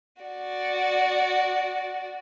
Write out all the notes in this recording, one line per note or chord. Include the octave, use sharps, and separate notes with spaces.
F#4 D5